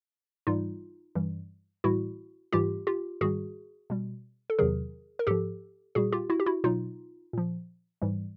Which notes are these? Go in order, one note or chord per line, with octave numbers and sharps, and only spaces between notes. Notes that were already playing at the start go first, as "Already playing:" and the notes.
G#2 E3 G3 D#4 F4
G2 E3 G3
A2 E3 G3 E4 F#4
G#2 E3 G3 F4 G4
F4 G4
G#2 D#3 G3 F#4 G#4
B2 G3
A4
E2 C3 D#3 F#3 G#4 A#4
A#4
G#2 F3 G4 A4
A#2 G3 F#4 G#4
F4 G4
E4 F#4
G4
E4 F#4
B2 F#3 D#4 F4
A#2 F3
G#2 E3 G3